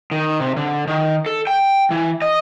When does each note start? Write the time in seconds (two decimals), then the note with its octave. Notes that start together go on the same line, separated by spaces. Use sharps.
0.11 D#3
0.40 C3
0.57 D3
0.87 D#3
1.26 A4
1.47 G5
1.91 E3
2.22 D#5